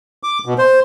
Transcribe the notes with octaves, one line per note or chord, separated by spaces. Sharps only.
D6
B2
C5